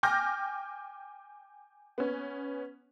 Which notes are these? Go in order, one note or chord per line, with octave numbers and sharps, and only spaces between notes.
G5 G#5 D6 F6 G6 A#6
B3 C#4